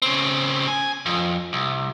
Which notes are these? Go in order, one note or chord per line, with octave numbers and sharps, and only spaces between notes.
C#3 C4
G#5
F2
C2